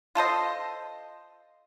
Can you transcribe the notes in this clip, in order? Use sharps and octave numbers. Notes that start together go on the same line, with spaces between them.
F4 A4 C5 D#5